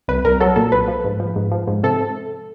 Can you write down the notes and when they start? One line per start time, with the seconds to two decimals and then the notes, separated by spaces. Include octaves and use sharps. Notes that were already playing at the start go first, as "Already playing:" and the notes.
0.08 C2 B4
0.24 C2 A#4
0.40 F#3 A4
0.56 A#2 A4
0.72 C2 B4
0.88 F3
1.04 G#2
1.20 F3
1.36 G#2
1.52 F3
1.67 G#2
1.83 C3 A4